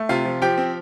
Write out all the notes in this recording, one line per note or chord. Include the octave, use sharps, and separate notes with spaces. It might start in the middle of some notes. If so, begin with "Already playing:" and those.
Already playing: A3
C3 F4 F5
F3
F3 G4 G5
C4